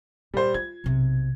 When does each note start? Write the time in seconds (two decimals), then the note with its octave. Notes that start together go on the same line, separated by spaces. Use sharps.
0.34 A#2 G3 C5
0.54 F4 G#6
0.84 B1 C3